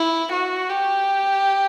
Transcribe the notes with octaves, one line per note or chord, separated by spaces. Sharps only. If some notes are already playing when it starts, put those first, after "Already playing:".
Already playing: E4
F#4
G4